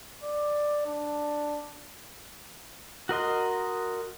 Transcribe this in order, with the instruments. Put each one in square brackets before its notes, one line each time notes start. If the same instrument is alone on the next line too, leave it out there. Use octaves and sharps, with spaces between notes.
[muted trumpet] D5
D4
[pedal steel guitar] F#4 A#4 D#5 C6